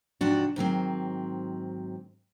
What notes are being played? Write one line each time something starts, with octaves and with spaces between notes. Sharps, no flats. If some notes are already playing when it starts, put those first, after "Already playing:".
G#2 C3 F3 D4 F#4
G#2 D#3 F#3 C4